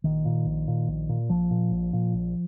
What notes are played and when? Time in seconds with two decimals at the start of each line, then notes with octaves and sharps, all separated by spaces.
0.04 A#1 D#3
0.25 A#2
0.46 A#1
0.68 A#2
0.88 A#1
1.09 A#2
1.29 A#1 F3
1.51 A#2
1.71 A#1
1.93 A#2
2.14 A#1